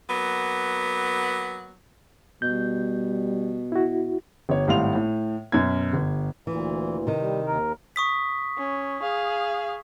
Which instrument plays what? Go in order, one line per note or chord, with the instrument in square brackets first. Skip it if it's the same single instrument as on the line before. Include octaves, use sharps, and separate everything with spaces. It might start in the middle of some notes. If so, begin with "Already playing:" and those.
[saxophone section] F#3 A#3 B3
[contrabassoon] B2 [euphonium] G3 [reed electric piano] G6
[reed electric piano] E4 F#4
[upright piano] G1 C#5
G#1 A2 G3 F5 C6 F7
A2
F#2 B2 G#6
G1
[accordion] D2 A#2 [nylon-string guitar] E3
[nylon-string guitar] C3 D#3
[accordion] G3
D#2 A#4
[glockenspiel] C#6 D#6 B6
[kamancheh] C#4
G#4 F5